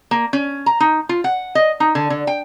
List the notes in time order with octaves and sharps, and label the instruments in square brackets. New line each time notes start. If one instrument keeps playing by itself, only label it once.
[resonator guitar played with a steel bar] A#3
C#4
A#5
D#4
F4
F#5
D#5
D#4
D3
D3
G5